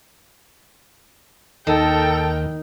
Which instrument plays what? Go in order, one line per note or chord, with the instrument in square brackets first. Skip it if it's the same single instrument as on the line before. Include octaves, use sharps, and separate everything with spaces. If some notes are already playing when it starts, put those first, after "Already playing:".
[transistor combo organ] D#2 [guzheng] D#3 [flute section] A4 [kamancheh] A#4 G5